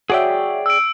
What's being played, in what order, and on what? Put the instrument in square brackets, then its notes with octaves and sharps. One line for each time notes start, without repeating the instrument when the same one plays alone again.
[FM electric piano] F#4 C#5 E5 [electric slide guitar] G#4 D5 G5
[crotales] E6 D7